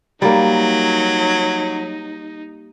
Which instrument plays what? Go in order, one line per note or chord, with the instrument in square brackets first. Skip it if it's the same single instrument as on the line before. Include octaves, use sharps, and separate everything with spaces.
[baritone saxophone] F#3 [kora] G3 A#3 [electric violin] D#4